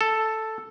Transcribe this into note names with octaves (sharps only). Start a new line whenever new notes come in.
A4